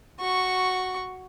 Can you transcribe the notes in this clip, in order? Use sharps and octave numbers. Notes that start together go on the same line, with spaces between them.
F#4 C#6